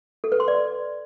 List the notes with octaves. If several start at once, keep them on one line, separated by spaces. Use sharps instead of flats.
A4
B4
C6
D5